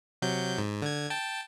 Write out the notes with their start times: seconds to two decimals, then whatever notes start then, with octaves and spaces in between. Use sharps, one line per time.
0.22 C3 F#3 G6
0.58 G#2
0.82 D3 G#6
1.10 G5 A5